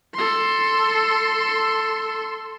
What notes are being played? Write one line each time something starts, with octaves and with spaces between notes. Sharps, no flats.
A4 C6